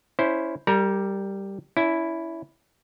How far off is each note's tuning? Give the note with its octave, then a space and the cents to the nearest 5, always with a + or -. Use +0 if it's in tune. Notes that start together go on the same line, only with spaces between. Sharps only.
C#4 +15 E4 +0 C5 +0
G3 +0 A#4 -35 A#5 +35
C#4 +35 E4 +0